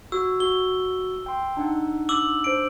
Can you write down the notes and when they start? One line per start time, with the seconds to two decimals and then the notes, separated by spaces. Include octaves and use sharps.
0.12 F#4 E6
0.40 F#4 G7
1.26 G5 C6
1.57 D4 D#4 F#5
2.09 D6 E6 F#7
2.44 D4 C5 D7